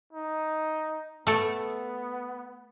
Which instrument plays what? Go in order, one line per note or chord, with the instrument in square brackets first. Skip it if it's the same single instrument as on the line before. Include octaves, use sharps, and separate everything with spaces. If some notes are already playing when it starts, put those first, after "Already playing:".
[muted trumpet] D#4
[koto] A3 A4 [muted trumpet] B3